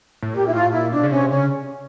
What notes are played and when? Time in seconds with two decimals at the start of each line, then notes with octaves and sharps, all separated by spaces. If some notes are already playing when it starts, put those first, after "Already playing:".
0.22 A2
0.33 A#2 G4
0.47 E4
0.53 A2 F4
0.72 A#2 E4
0.92 B2 D4
1.03 C#3
1.11 C3 C#4
1.31 C#3 C#4